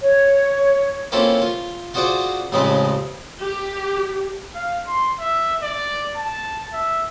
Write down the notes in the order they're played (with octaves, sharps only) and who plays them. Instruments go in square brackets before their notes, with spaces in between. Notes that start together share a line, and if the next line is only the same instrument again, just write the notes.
[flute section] C#5
[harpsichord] A#3 C4 C#4 E4 F4 A4
F4
F4 F#4 G#4 C5 D5 F#5
A1 C#3 F3 G#3 C4 B4
[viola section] G4
[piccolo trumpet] F5
C6
E5
D5
A5
E5